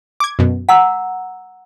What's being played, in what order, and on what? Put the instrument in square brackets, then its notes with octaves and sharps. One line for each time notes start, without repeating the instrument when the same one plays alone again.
[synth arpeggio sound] D6 G#6
F#2 B2
[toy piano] F#5 A#5 E6 [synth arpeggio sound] B6